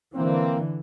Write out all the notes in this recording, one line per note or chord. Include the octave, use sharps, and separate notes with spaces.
D3 E3 A#3 C4